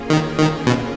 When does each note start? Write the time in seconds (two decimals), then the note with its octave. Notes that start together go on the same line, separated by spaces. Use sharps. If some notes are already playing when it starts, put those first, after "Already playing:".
Already playing: A#3 C#4 F4 G#4
0.10 D#3
0.39 D#3
0.66 B2